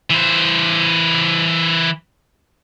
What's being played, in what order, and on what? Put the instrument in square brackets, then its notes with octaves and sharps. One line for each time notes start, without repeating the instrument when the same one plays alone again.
[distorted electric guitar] E3 C5